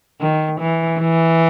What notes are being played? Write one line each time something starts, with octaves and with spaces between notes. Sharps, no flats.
D#3
E3
E3